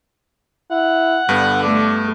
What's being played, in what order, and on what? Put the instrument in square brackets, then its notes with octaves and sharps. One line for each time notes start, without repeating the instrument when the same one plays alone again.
[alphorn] E4 [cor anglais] F#5
[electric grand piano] G2 B3 [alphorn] D3
[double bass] A3 [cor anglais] D4